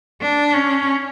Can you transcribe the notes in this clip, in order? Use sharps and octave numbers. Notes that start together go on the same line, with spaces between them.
D4
C#4